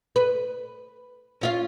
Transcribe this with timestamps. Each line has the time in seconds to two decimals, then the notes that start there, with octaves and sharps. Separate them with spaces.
0.16 B4
1.41 C#4 F4 F5